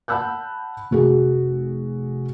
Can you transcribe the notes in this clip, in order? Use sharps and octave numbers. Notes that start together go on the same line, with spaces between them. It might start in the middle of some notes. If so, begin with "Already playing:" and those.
F#5 A5 B5 E6 F#6 G6
F1 F#4 G#4